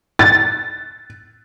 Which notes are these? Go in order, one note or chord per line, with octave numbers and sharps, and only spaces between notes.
A6